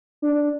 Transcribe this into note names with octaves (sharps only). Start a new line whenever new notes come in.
D4